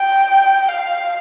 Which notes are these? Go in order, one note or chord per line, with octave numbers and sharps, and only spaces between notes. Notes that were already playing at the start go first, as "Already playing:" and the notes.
Already playing: G5
F5